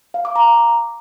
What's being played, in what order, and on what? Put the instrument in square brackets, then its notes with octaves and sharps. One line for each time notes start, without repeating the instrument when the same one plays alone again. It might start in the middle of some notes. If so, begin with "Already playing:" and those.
[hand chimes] F5
D6
A#5